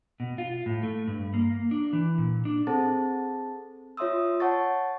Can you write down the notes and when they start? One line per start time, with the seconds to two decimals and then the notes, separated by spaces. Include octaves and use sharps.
0.20 B2
0.38 F4
0.66 A2
0.83 A3
1.07 G2
1.34 A#3
1.71 D4
1.93 E3
2.18 A#2
2.45 D4
2.67 C4 G#4 A4 C5 A5 A6
3.97 F4 C#5 E5 C6 D#6 E6
4.40 C#5 F#5 A5 C#6 A6